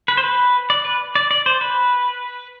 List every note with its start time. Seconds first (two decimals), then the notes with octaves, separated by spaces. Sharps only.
0.08 B4
0.17 C5
0.24 B4
0.70 D5
0.85 B4
1.15 D5
1.31 D5
1.46 C5
1.61 B4